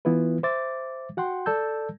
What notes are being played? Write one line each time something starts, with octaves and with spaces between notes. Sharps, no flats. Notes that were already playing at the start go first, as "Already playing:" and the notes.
E3 B3 E4 F4 B4
C5 E5 D6 A6
F#4 F#5 G5 C6
A4 D5 A5 E6 G6